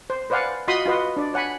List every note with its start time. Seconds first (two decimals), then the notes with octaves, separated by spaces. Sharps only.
0.10 C5
0.30 B4 C5 D5 F5 F#5 G#5
0.68 F4 F#4 D#5 B5 C6 D#6
0.86 F4 F#4 B4 D#5 C6
1.17 D4 D5
1.34 C#5 F#5 G#5 B5